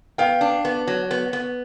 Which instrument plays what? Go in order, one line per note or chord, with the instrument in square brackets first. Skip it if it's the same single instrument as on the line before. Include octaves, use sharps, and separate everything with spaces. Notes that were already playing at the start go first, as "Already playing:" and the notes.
[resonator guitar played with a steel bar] B3 [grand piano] F5 G5
[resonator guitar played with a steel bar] D4
B3
F#3
B3
B3